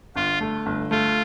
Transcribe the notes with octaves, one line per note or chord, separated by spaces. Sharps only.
G1 F4
A3
G1
A3 F4